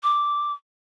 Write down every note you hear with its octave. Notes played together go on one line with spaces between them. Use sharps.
D6